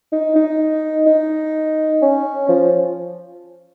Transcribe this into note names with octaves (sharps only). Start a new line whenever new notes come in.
D#4
D#4
D#4
C#4
F3